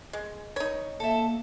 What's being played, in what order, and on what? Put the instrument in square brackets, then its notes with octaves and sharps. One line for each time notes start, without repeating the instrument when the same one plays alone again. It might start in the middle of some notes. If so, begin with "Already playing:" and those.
[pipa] G#3
D#4 C#5
[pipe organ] A#3 [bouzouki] A4 E5